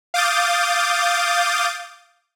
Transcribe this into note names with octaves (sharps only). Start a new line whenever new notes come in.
F5 D6 D#6 G6 A6